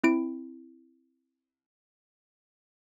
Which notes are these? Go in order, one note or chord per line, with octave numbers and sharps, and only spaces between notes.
C4 E4 D7